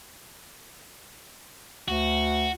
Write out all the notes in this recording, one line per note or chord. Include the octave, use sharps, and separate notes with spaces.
D2 F#4